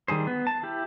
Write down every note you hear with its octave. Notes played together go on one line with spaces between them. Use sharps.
D#3 G3 G#4 C5
B3
A5
E4 G4